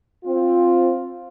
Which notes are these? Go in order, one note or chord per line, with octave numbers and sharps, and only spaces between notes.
C4 F4